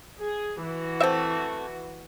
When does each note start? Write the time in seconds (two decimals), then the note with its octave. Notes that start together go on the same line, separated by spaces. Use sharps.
0.19 G#4
0.63 E3 F#4
1.00 A3 C4 E5